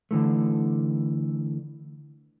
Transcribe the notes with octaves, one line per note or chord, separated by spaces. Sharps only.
D3 E3 A3